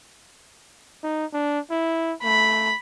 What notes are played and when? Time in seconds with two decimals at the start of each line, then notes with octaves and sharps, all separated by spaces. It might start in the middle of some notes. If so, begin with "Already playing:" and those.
1.03 D#4
1.33 D4
1.70 E4
2.24 A3 B5